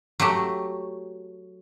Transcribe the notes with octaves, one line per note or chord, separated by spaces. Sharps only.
F#3 A3 G4